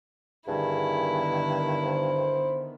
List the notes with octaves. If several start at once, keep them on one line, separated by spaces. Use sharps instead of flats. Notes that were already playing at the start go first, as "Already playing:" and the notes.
G2 D3 D#3 B3 E4 G#4
C5